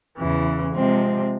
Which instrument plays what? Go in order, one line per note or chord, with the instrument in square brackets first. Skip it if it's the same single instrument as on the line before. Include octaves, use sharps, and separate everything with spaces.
[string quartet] E2 C#3 E3
C3 F3 G#3 C4